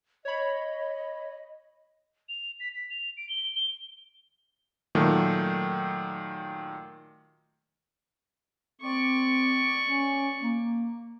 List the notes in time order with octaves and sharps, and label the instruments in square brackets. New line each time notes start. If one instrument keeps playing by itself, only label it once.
[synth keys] C#5 B5 [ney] D#5
[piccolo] F7
B6
B6
F7
D7
G7
G7
[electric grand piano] A#2 D#3 F#3 A3
[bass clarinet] C4 [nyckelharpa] D5 C#6
[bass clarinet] C#4
A#3